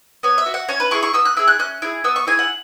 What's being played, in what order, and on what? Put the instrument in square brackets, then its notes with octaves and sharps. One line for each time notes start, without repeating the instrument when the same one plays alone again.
[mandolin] B3 C#5
E5
F#4
F#5
C#4 C#5
B4
E4 G#4 C#6
C#6
B3 E6
F#6
E4 G#4 E6
F#6
C#4 F#6
E4 G#4
B3 E6
C#6
E4 G#4 G#5
F#5